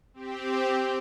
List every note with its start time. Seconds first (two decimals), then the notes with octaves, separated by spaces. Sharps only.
0.14 C4 G4